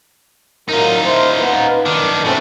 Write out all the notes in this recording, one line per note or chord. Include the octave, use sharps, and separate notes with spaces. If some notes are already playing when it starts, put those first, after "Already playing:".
A2 F#3 D#4 F4 A#4
E4 C5
B3 B4 B5
F#2 D#3 D4
B2 A3 C4 C#4 A4